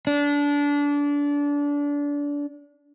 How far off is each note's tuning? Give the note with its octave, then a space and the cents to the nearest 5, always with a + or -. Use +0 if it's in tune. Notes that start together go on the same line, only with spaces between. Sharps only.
D4 -25